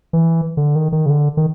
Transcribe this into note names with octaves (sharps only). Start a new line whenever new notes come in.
E3
D3
D#3
D#3
C#3
D3
D#3